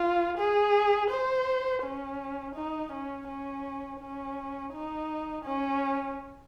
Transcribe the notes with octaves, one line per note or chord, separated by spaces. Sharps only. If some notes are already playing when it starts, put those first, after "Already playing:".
Already playing: F4
G#4
C5
C#4
D#4
C#4
C#4
C#4
D#4
C#4